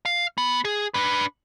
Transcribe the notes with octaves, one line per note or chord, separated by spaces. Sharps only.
F5
B3
G#4
D4 B4